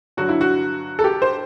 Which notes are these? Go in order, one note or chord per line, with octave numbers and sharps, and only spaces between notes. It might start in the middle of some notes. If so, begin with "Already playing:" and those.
G2 D3 F#3 F#4
E4
F#4
A4
G4
C5